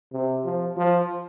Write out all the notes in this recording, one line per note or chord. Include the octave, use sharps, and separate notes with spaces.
C3
F3
F3